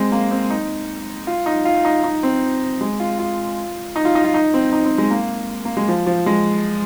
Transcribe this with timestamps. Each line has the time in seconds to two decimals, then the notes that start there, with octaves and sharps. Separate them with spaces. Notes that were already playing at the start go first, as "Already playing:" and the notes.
Already playing: G#3 C4
0.12 A#3
0.31 C4
0.50 D#4
1.27 F4
1.46 D#4
1.65 F4
1.85 D#4
2.04 D#4
2.23 C4
2.81 G#3
3.00 F4
3.19 F4
3.96 D#4
4.05 F4
4.15 D#4
4.24 F4
4.34 D#4
4.54 C4
4.73 D#4
4.85 C4
4.98 G#3
5.11 A#3
5.65 A#3
5.77 G#3
5.88 F3
6.06 F3
6.26 G#3